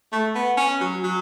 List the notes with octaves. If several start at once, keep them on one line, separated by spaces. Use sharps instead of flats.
A3
B3
C#4
F#3
F#3